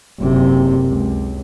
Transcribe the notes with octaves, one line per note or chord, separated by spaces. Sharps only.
F#1 C3
C#2